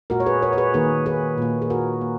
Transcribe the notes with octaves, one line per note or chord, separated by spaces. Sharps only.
A#2 G#3 F#4 A#4
C#5
G#4 B4
A#4 C#5
C#5
G#4 B4
D#3 A#3 G#4 B4
G#4 B4
A#2 A#3
G#4
F#4 A#4
A#3